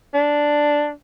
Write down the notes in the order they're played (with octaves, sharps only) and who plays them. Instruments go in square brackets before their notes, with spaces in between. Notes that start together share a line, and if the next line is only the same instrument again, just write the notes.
[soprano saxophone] D4